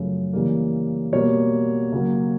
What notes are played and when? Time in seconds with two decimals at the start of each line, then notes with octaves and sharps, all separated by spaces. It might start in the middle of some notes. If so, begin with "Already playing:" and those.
Already playing: F#2 C#3 F3 A3
0.33 C#3 E3 G3 A#3
1.13 B2 G3 A#3 C#5
1.93 C#3 F#3 A#3